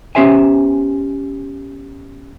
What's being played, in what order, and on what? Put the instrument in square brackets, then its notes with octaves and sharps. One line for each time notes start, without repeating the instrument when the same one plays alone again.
[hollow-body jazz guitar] B3 C#4 G4 C5 E5 G#5